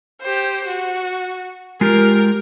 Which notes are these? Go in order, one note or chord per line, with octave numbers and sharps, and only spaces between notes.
G4 C5
F#4
G#3 F4 G4 A#4